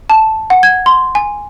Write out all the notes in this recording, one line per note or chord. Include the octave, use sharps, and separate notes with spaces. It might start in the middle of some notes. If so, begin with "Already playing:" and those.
A5
F#5
G#6
C6
G#5